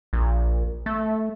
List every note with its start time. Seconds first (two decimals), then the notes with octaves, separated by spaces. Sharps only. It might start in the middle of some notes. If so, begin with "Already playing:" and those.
0.13 A#1
0.86 A3